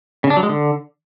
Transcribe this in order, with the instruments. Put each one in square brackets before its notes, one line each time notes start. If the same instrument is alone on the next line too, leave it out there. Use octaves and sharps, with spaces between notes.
[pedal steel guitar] C#3
D4
F#3
G#3
D3